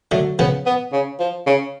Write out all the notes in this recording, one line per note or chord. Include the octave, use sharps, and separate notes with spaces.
D3 F#3 A3
C#3 F3 B3
B3
C#3
F3
C#3